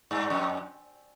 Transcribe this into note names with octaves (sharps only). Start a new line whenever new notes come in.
G2
F2